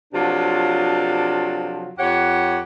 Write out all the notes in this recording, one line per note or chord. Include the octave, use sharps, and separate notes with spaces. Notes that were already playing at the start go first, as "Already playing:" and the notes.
C3 F3 F#3 D4 F4 A4
F2 G4 C#5 F#5